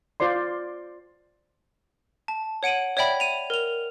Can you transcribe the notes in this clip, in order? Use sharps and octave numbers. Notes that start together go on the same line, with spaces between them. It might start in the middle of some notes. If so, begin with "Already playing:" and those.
F4 C5 D5 C6
A5
C#5 F#5 D7 D#7 F#7
C#5 D5 E5 G5 B5
D#7 F7
A#4 F7